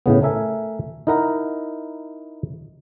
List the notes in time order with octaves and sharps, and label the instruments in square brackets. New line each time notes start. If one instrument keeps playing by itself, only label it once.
[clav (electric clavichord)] A2 C#3 B3
A3 A#4 E5 G#5
D#4 E4 A#4 F#5 A#5